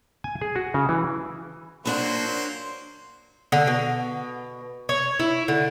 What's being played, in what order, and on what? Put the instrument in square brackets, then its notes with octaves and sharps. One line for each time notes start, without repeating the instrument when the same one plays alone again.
[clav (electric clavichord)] G#5
G#4
F#4
C#3
E3
[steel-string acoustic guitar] A#2 D4 F#5 [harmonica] F#3 A#3 C5
[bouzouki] D3
B2
C#5
E4
D3